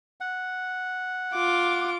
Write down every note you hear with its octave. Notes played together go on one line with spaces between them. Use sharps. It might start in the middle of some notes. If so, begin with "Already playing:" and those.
F#5
F4 D6